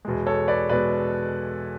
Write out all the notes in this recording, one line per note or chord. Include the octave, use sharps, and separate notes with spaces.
E2 B2 G#3
A4 C#5
B4 D5
B2 G#3 B4 D5